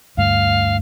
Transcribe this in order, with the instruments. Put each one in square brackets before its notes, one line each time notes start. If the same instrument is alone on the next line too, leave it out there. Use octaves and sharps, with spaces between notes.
[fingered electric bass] D2 G2 A3 [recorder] F5